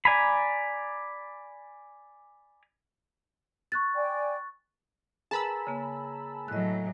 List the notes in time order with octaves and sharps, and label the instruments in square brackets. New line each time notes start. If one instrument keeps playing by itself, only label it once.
[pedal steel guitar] D5 G#5 A#5 B5
[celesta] C#6 F#6 A6
[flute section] D5 G5 G#5
[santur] G#4 A#4 B4 [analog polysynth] A5 B5 E6
[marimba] C#3 A#3
[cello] A2 F#3 [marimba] D#5 F#6